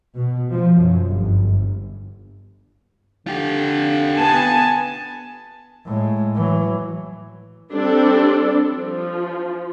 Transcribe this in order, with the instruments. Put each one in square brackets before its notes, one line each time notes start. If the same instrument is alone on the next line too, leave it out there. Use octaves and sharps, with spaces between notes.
[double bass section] B2
F3
F#2
G1
[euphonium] D3 [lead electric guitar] F4 G4
[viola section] B3 G#5 A5
[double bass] A2 G#3
E3 F#3
[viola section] G3 C4 D4 A4
F3